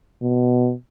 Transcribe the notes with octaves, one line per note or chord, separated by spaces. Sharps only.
B2